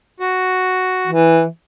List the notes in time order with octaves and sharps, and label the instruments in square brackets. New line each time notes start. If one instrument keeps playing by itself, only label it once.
[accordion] F#4
[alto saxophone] E3